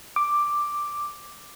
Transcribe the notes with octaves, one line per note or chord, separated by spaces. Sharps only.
D6